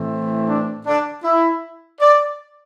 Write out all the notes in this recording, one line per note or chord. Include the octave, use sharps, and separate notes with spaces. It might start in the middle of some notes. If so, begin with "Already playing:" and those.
Already playing: A2 E3 A3 C4
D4
D4
E4
D5